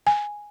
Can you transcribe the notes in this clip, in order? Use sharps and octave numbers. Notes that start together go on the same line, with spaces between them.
G#5